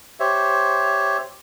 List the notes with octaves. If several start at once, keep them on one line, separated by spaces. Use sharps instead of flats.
G4 C5 C#5 E5